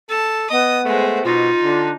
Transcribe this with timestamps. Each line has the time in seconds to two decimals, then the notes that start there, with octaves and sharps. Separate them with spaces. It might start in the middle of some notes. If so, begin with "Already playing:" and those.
0.10 A4 A5
0.50 B3 D#5 D#6
0.85 G#3 A3 C5
1.25 B2 D#4 F4
1.63 D3 D4